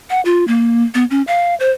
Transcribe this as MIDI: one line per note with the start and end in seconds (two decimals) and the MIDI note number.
0.10 0.21 78
0.25 0.47 65
0.48 0.83 58
0.95 1.05 59
1.11 1.22 61
1.27 1.55 77
1.60 1.70 72